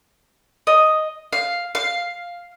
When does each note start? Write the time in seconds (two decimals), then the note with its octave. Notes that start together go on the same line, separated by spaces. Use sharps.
0.67 D#5
1.33 F5
1.75 F5